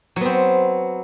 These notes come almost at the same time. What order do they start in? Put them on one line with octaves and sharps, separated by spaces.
F#3 B3 C4